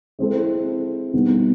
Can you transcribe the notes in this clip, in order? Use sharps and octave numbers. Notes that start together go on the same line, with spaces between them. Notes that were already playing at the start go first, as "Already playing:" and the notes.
G#3 C4 E4 A4
B2 G3 B3 D#4